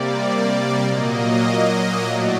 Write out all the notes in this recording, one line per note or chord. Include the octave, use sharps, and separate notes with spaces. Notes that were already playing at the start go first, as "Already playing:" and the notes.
Already playing: C3 G3 A#3 D5
A#2 F#3 A#3 D#5
A2 F#3 A3 D5